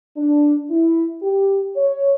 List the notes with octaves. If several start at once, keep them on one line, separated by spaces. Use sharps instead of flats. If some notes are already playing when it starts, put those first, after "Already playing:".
D4
E4
G4
C#5